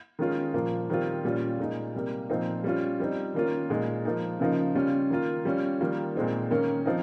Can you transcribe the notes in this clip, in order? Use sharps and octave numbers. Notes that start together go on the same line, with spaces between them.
D#3 G#3 C#4 F4
A#2 F3 A#3
D#3 G3 C4 F4
A#2 G3 C#4 F4
A#2 G#3 D#4
C3 G3 A#3
A#2 F3 C4 D#4
G3 C#4 F4
G3 C4 D#4
D#3 A#3 C#4 F4
A#2 G#3 D#4
F3 A#3 D#4
C#3 F3 A#3 D#4
C#3 G3 C#4 F4
D#3 A#3 F4
G3 C#4 F4
D#3 G3 A#3 F4
A#2 G#3 C4 D#4
D#3 A#3 C#4
F3 C4 D#4